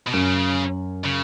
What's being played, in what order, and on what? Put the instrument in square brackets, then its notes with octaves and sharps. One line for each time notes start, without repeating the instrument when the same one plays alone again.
[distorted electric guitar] B2
[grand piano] F#2 [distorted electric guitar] C#3
[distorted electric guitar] C#3